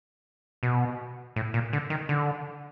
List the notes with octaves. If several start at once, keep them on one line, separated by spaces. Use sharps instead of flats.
B2
A2
A#2
D3
D#3
D3